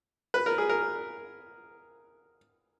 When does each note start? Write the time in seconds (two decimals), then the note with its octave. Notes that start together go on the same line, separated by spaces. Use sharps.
0.34 B4
0.46 A#4
0.58 G#4
0.69 A#4